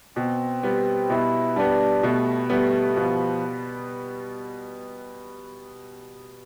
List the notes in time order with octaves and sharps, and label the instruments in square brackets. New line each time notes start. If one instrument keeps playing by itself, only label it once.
[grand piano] B2 [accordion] C4
[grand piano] G3 B3
[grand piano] B2 [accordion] E4
[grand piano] G3 B3 [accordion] D4
[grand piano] B2 [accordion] A3
[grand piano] G3 B3 [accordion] A3
[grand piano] B2 [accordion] F3